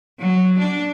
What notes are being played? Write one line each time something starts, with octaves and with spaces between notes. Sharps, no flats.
F#3
D4